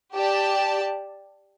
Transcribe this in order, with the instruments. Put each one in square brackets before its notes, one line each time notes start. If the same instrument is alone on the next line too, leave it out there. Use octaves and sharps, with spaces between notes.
[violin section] G4 D5 A5